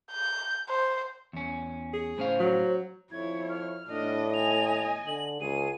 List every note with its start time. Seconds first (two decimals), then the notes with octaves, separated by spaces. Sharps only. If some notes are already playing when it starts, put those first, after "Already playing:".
0.11 G6
0.69 C5
1.33 E2 C#4
1.93 G#4
2.18 A2 C#4 C5 F5
2.40 F#3
3.12 F2 E4 C#5 G#6
3.49 F6
3.88 A2 D4 D#5
4.34 D#5 G#5 F7
5.07 D3 F#7
5.41 C#2 G#4 D#7